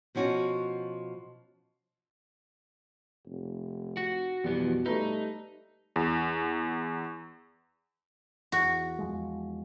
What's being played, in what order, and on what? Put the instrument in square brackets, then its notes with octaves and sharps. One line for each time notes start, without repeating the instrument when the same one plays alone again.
[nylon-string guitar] B2 F3 C#4 F#4
[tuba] F1
[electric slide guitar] F#4
[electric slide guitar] F2 E3 B3 [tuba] B2 [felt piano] G3
[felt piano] G3 A3 B4 [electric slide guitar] D#4
[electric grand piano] E2
[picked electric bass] E2 [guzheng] F#4
[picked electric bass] E2 F3 G#3